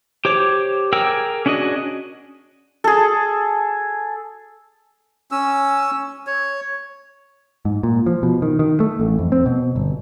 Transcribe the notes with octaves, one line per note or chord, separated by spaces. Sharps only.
G4 C5 C#5 D6
G#4 A#4 G5 D6 E6
C#4 D4 F#4 G#4 D#5
G#4 A4
C#4 E6
C#5
G#2
A#2
F3
B2
D#3
D#3
A3
A1
F2
C4
B2
G1